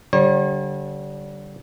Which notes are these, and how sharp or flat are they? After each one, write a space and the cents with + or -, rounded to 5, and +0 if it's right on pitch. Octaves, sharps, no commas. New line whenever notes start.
D3 -15 G3 -20 C#5 -45